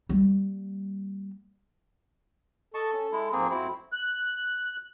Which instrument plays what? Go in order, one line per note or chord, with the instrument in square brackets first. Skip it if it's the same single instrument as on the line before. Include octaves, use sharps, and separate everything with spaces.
[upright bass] G3 A#3
[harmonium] A4 [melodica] D#5 A5 C#6
[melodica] C#4
G#3 E4
[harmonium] G#2 F3 [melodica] A#3 C4 G#4
[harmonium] F2 F#4 [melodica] C4 E4
[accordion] F#6